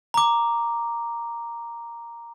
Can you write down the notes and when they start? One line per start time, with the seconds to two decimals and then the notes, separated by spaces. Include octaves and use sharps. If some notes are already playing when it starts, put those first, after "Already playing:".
0.14 A#5 D6